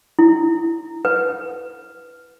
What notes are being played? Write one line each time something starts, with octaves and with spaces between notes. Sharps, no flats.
E4
B4